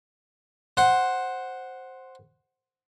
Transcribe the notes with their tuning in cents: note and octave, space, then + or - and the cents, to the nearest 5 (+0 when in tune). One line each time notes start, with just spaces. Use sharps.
C5 +5 F#5 +0